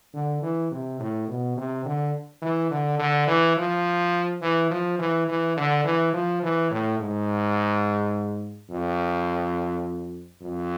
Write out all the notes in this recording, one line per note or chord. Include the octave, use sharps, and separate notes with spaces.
D3
E3
C3
A2
B2
C3
D3
E3
D3
D3
E3
F3
E3
F3
E3
E3
D3
E3
F3
E3
A2
G#2
F2
F2